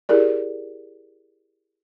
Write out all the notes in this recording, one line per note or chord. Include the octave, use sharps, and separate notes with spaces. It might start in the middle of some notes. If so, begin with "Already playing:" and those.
E4 G4 G#4 A#4 D5